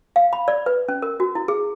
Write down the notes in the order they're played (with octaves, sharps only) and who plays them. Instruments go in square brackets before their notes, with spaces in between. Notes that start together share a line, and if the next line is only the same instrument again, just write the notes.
[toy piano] F5
B5
D5
B4
C#4
A#4
F#4
E4
G#4